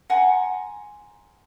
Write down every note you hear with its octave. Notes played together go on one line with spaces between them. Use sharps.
F#5 G#5 A#5 C6